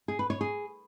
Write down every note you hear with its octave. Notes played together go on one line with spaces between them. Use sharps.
G#4
B4
C#5
G#4